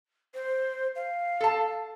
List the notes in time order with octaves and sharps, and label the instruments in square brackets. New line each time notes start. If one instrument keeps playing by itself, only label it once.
[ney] C5
F5
[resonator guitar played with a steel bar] A4 A5